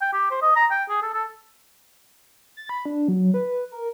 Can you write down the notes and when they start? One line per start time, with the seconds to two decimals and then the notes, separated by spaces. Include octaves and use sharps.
0.01 G5
0.13 G4
0.31 C5
0.42 D#5
0.56 A#5
0.71 G5
0.89 G#4
1.03 A4
1.14 A4
2.57 A6
2.69 B5
2.86 D4
3.08 F#3
3.34 B4
3.72 A#4